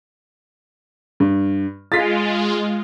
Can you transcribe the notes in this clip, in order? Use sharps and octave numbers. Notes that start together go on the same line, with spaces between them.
G2
G#3 F4 A6 B6